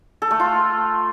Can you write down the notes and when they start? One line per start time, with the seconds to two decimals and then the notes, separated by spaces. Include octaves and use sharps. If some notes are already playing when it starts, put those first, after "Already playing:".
0.22 A4
0.31 A3
0.40 F4